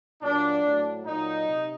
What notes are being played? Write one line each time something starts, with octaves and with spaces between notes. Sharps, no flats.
A#2 F#3 D4
A2 F#3
A#2 F#3 D#4
C3